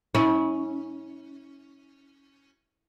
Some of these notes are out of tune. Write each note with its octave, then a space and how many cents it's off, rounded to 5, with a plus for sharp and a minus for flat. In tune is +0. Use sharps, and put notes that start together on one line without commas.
C#4 +0 E4 -40